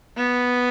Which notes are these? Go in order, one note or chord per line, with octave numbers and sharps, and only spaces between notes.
B3